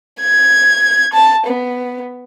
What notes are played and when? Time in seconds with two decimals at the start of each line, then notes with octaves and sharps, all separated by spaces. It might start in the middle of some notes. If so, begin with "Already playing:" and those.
0.20 G#6
1.13 A5
1.47 B3